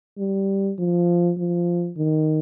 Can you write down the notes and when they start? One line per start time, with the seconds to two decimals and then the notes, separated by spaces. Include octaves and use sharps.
0.18 G3
0.79 F3
1.38 F3
1.97 D#3